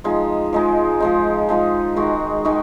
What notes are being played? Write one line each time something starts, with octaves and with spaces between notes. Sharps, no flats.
F3 G#3 D#4
F3 G#3 D#4
F3 G#3 D#4
F3 G#3 D#4
D#3 G#3 D#4 F#4
D#3 G#3 D#4 F#4